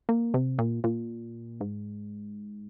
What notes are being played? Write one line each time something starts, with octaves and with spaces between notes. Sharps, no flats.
A#3
C3
A#2
A#2
G#2